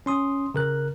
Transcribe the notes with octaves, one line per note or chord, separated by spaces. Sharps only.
C#4 C6 D#6
C#3 A#4 F#6